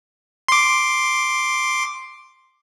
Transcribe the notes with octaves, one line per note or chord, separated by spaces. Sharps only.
C6 D6